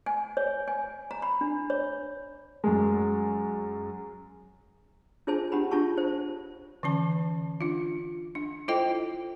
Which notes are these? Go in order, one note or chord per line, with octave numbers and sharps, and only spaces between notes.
G#5
C#5
G#5
A#5
B5
D4
C#5
F#2 G#3
D4 F4 G#4 C5 G#5 A5
D4 G4 F#5 G5 B5
D4 F4 G#4 A5 C#6
C5
D3 E3 C#4 A5
D4 F4
D4
E4 F4 A4 C5 D#5 G5